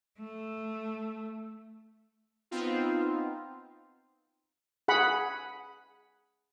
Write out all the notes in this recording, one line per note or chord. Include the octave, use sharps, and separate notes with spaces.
A3
B3 C4 D#4 F4
G#4 F#5 B5